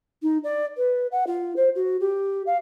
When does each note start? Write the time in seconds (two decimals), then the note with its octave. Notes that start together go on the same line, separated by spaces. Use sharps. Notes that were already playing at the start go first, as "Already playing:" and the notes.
0.23 D#4
0.44 D5
0.77 B4
1.12 F#5
1.27 F4
1.56 C5
1.75 F#4
2.00 G4
2.46 F5